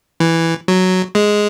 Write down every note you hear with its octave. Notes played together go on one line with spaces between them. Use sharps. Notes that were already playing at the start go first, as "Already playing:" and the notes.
E3
F#3
G#3